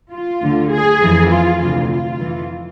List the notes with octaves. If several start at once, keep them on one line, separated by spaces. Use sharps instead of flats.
F4
D2 D3
G#4
F2 E3
F4
D2 C3 E3 F4
F4
F2 E3